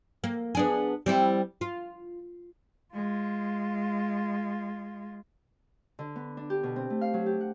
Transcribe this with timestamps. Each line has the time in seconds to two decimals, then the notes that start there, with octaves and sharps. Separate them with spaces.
0.24 A#3
0.55 B3 D4 G#4
1.06 G3 C4 E4
1.61 F4
2.94 G#3 F4
5.99 D3
6.16 B3
6.37 D4
6.50 G4
6.63 B2
6.76 C4
6.90 A3
7.01 F5
7.14 F#3
7.26 G4
7.41 F#5